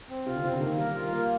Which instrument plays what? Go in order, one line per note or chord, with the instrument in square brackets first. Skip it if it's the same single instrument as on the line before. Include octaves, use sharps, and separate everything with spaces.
[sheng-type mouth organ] C4
[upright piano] C3 [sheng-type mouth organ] F4
[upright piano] D3
[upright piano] C3 [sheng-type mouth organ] C4
[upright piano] D3
[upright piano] D#3 [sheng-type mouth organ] A#3
[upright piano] G3 [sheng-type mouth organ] A#4
[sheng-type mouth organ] F4
A#3